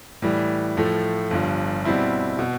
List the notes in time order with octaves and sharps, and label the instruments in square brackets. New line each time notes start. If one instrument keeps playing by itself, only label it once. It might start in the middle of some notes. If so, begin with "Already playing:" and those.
[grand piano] A2 E3 G3
A2 F3 A3
G1 G2 F3
B2 G3 C4 E4
B2